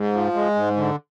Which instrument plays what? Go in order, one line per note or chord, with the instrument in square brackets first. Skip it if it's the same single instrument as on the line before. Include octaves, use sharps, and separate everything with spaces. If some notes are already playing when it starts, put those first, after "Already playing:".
Already playing: [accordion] G#2
F3
G#3
G#2
D3